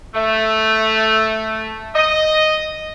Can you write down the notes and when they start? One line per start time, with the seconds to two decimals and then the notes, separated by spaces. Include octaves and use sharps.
0.14 A3
1.95 D#5